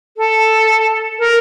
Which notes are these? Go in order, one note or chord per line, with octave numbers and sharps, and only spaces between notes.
A4
A#4